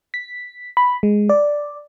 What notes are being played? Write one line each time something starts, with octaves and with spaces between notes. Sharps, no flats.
B6
B5
G#3
D5